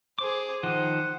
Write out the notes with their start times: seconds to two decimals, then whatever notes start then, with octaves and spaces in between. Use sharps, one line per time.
0.19 G#4 C5 D6
0.63 D#3 F3 C5 D#5 F#5